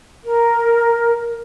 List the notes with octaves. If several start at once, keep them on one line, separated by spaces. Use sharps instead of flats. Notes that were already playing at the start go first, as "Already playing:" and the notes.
A#4